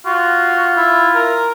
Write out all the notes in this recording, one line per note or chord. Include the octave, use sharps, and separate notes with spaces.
F4 F#4
E4
A#4